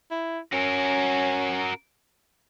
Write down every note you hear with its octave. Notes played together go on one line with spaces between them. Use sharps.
E4
C#4 F#4 A#4